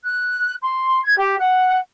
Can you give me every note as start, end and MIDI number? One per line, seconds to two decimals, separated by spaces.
0.04 0.51 90
0.59 0.99 84
1.04 1.14 92
1.15 1.37 67
1.38 1.74 78